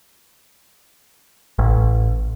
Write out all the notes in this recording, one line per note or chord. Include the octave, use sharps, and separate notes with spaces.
A1